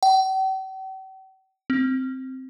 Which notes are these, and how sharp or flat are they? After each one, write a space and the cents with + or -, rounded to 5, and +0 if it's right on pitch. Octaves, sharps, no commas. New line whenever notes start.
G5 -45
C4 +0